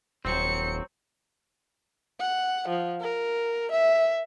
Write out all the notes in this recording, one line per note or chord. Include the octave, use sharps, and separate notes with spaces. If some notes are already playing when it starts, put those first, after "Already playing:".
D#1 F#3 C4 C5 C#7
F#5
F3
A#4
E5